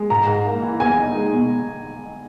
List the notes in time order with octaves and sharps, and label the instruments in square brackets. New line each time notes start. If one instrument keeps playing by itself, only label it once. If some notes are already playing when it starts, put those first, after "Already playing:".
Already playing: [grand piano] G#3
[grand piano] G#2 [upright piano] A#5
[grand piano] G#2
A#3
E3
[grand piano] E2 [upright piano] G#5
[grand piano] D#4
G#3
B2